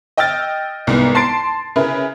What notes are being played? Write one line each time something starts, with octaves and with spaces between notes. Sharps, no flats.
D#5 G5 E6 F6 A6
C2 G#2 B3
A5 C6 A6 C7 D7
C#3 E4 A#4 B4